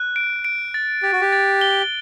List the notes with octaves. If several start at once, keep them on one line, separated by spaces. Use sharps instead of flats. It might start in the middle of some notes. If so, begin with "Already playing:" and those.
Already playing: F#6
D7
D7
A6
G4 A6
F#4
G4
A6
G7